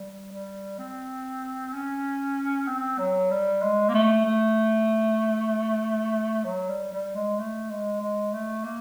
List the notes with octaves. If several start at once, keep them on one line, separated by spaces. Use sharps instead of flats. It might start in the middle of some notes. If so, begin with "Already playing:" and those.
Already playing: G3
G3
C4
C#4
C4
F#3
G3
G#3
A#3
A3
A3
F#3
G3
G3
G#3
A3
G#3
G#3
A3
A#3